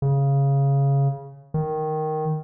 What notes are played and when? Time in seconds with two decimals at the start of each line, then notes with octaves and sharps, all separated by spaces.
0.02 C#3
1.54 D#3